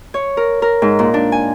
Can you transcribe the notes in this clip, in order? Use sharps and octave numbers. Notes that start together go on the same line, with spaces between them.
C#5
A#4
A#4
G#2
A#2
D4
G#5